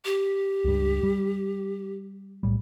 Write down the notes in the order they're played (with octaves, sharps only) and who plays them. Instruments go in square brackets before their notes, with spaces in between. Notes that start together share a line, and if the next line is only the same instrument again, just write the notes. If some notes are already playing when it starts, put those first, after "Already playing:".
[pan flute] G4
[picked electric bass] C#2 G2
G3
B1 A2 G3